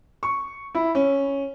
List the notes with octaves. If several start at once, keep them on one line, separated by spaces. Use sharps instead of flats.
C#6
E4
C#4